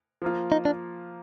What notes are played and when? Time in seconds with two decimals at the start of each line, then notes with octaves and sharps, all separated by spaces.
0.22 F3 A#3 F4
0.52 D#4
0.65 D4